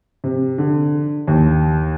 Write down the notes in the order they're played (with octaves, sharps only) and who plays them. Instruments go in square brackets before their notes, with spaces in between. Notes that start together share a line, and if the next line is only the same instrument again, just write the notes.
[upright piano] C3
D3
D#2